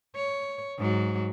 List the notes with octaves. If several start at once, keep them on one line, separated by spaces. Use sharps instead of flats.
C#5
G#2 F#3